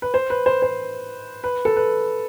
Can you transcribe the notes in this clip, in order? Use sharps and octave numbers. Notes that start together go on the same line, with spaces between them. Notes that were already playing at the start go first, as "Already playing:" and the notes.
B4
C5
B4
C5
C5
B4
A4
B4